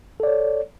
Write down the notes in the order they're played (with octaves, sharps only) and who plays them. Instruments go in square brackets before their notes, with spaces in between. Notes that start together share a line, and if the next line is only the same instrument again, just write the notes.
[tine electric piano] A4
D5
C#5